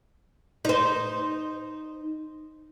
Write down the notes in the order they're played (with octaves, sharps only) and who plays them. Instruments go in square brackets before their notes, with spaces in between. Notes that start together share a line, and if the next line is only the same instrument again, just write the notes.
[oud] D#4 C5